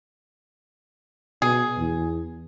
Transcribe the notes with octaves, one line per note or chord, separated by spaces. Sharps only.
B2 G#4
E2